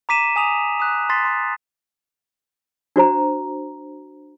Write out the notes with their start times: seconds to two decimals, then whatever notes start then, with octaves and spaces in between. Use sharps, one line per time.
0.09 A#5 D6 B6 D#7 E7
0.36 G#5 D#6 F7
0.80 D#6 F#6
1.10 C6 A6 B6 C7
1.25 C6
2.96 D4 F#4 C5 A#5